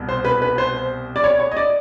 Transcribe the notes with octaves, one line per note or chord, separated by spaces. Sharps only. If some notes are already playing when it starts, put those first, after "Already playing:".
Already playing: C2 B2
C5
B4
B4
C5
D5
C#5
C#5
D#5
D5